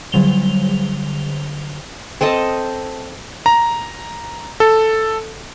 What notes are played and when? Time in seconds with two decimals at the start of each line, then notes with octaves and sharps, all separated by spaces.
0.12 D3 F#3 G3 F7 G7
2.21 C4 A4 D#5 A5
3.46 A#5
4.60 A4